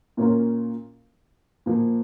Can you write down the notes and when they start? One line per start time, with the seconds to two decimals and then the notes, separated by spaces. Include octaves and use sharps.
0.17 A#2 A#3 C#4 F4 A#4
1.66 A#2 F3 A#3